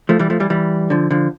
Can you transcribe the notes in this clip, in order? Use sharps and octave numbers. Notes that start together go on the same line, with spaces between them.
F3 A3
E3 G3
F3 A3
E3 G3
E3 G3
D3 F3
D3 F3